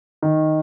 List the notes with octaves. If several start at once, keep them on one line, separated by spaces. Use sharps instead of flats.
D#3